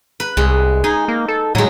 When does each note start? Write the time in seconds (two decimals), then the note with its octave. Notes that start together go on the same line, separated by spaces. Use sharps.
0.20 B4
0.37 C2 G#3
0.84 D#4 G#4
1.08 A#3
1.28 A4
1.55 A2 F#3 G#3